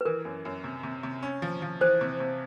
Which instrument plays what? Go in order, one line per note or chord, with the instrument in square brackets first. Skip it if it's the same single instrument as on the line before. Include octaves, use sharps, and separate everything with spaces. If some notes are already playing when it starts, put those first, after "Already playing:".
[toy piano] B4
[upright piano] E3 [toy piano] A#4
[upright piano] F#2
F#2
C3
C3
C3
C#4
F3
F3
[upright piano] E3 [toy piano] C5
[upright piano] C3
C3